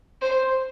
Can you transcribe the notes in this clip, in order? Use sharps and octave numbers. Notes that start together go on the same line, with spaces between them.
C5